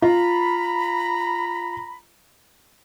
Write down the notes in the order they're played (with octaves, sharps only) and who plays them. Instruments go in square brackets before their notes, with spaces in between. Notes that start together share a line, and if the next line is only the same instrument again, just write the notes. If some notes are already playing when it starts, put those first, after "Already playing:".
[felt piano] F4 [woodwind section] A#5 B5